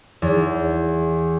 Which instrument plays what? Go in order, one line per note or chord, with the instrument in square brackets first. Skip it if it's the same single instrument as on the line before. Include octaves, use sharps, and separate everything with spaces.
[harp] E2